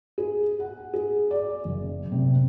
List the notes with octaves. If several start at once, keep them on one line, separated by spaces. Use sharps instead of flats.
G#4
F#5
G#4
D5
F#1
C3